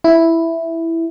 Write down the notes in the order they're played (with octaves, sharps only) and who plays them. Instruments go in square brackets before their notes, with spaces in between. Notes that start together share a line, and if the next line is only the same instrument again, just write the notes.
[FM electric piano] E4